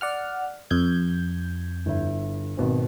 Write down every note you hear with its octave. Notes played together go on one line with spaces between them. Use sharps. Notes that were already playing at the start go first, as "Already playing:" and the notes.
D5 F#5 F6
F2 G6 G#6
G1 E4 E5
G#1 B2 C4